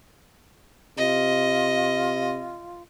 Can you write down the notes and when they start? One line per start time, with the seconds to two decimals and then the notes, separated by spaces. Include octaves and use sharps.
0.98 C3 F4 D#5